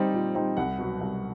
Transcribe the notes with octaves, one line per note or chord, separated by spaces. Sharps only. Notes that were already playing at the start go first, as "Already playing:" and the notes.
Already playing: G3 C4 D#4
A#2
G3 C4 D#4
C2 F#5
B2 F#3
C2